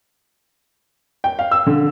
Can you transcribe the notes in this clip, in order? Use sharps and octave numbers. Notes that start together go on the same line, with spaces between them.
G5
F5
E6
D3